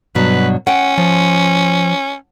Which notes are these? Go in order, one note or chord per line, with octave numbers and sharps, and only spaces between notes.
G2 B2 F#3 B4
C#4 F#5 G5
F3